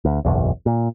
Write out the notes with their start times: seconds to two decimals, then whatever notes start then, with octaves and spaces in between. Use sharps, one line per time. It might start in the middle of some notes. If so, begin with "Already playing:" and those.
0.05 D2
0.25 F#1 B1 E2
0.66 A#2